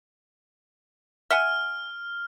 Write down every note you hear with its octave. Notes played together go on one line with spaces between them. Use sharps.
E5 F#5 G#5 F6